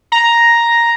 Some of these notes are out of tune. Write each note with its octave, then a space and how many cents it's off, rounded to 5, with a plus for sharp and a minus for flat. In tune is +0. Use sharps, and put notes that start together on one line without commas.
A#5 +5